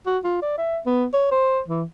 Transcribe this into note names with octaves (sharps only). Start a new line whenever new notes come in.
F#4
F4
D5
E5
B3
C#5
C5
E3